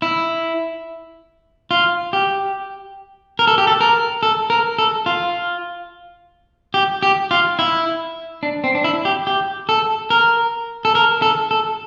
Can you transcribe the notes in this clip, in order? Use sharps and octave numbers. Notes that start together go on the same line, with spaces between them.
E4
F4
G4
A#4
A4
G4
A4
A#4
A4
A#4
A4
F4
G4
G4
F4
E4
D4
C4
D4
E4
G4
G4
A4
A#4
A4
A#4
A4
A4